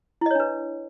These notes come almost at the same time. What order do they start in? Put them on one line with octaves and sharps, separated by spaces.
E4 D#5 C#5 D4 B4